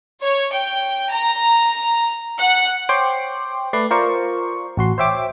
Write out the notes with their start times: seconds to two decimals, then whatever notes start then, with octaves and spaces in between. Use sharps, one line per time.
0.21 C#5
0.53 G5
1.10 A#5
2.40 F#5
2.89 C5 C#5 G5 C6 D6
3.73 A3 B4 D5 C7
3.90 F4 A#4 C5 D5 C#6
4.77 A1 F#4 C6
4.98 C5 C#5 E5 G5 D6